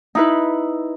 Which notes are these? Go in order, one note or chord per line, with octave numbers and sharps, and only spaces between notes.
D#4 E4 B4